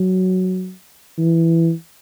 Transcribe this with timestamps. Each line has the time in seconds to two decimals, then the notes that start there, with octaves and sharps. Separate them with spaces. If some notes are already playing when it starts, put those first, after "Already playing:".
Already playing: F#3
1.18 E3